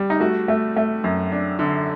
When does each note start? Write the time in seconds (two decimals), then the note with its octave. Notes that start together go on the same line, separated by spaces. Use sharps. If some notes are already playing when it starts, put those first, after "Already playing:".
Already playing: G3
0.10 D#4
0.20 A3 F#4
0.48 A3
0.76 A3
1.04 F#2
1.32 D4
1.59 D3